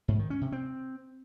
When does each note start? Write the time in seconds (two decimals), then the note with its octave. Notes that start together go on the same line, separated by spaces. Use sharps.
0.08 G#2
0.19 D#3
0.30 C#4
0.41 C3
0.52 C4